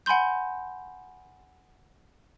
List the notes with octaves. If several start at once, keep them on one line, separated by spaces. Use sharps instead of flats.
F#5 G#5 B5 C6 G6